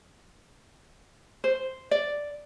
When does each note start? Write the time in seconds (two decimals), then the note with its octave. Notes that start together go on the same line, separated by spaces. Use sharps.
1.44 C5
1.91 D5